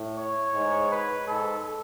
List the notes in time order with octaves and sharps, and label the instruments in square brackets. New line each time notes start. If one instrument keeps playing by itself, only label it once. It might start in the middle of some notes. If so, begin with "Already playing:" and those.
Already playing: [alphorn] A2
[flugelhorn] C#5
[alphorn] G#2
[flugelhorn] B4
[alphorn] G#2 [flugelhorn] A4